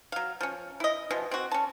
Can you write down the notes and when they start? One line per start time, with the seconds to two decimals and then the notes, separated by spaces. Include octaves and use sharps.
0.12 F#3 F5
0.41 F3 C#4
0.80 E4 D#5
1.11 B2 E3 F3
1.31 C4 F#4
1.51 C#4 A5